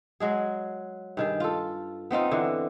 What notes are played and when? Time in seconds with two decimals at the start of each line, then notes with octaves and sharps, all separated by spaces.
0.20 F#3 G#3 G#4
1.17 G2 D#3 G#4
1.40 F4 A4
2.11 B3 C4 D#4 F4
2.31 D3 E3